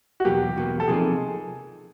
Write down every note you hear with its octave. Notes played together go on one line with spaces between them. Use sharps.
F#4
E2 B2 F#3 A#3 G4
E2 B2 F#3 A#3
A4
C3 F3 A#3 D#4 G#4